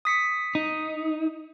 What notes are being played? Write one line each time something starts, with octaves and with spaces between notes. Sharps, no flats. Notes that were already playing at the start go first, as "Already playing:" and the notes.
D#6 B6 C#7
D#4